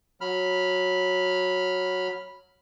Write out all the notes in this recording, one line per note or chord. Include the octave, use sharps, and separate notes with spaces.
F#3 B5 F6